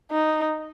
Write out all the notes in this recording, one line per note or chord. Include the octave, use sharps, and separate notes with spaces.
D#4